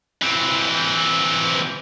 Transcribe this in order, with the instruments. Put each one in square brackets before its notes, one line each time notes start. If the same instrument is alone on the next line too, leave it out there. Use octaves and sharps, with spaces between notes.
[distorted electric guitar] E3 C4